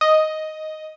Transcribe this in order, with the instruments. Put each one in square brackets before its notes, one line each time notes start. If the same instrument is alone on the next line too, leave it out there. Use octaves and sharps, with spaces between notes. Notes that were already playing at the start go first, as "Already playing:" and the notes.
[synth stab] D#5